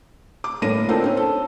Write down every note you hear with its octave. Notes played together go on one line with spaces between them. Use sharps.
D6
G1 A2 A#3 C#4 A#6 D#7
C4 D4 D#4 F4 A4 A#4
C4 C#4
A4